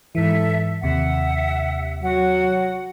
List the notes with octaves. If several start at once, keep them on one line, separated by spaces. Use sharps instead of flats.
G#2 E3 A4 E5
D#2 C3 E5 F#5
F#3 F#4 F#5